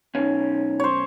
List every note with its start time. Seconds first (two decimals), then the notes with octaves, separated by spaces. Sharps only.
0.15 B1 C#4 D#4
0.80 C5 C#5